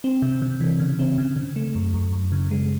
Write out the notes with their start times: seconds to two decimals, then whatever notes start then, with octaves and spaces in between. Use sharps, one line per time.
0.04 C4
0.22 C3
0.42 C3
0.60 E3
0.79 C#3
0.99 C4
1.18 C#3
1.36 C#3
1.56 A3
1.75 F#2
1.94 F#2
2.12 F#2
2.32 C#3
2.51 G#3